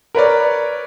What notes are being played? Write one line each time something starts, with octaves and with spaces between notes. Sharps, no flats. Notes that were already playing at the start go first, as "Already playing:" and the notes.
A#4 B4 C#5 D5